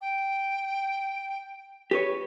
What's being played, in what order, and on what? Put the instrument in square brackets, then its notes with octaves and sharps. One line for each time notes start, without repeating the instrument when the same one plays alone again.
[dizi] G5
[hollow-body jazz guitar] G4 B4 C#5